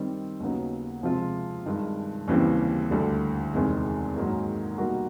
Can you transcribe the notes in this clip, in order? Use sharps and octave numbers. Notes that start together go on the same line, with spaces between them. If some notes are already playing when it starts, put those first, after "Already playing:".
Already playing: D#3 G3 C4
D#2 C#3 F#3 B3 D#4
C3 F3 G#3 C4 F4
G2 D#3 G#3
D#2 C#3 E3 G3 C4
D2 D3 G3
E2 C3 D#3 G#3 C4
G#2 D#3 F#3 A#3 D#4
B2 G3 A#3 D#4 F#4